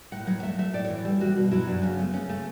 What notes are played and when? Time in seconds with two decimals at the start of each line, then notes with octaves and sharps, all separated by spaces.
0.12 A2 F#5
0.27 F#3 F#5
0.43 A3 E5
0.58 A3 E5
0.73 A2 D5
0.84 C#5
0.90 E3
1.05 G3 A4
1.21 G3 F#4
1.36 B2 F#4
1.51 F#3 E4
1.67 F#2 D4
1.82 C#3 C#4
1.98 A3 B3
2.13 C#3 C#4
2.29 A3